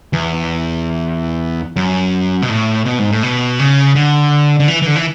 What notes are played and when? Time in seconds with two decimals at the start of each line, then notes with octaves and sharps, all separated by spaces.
0.13 E2
1.76 F#2
2.42 B2
2.49 A2
2.85 B2
2.99 G#2
3.11 A2
3.23 B2
3.59 C#3
3.95 D3
4.60 D3
4.68 E3
4.82 E3
4.87 D3
4.96 E3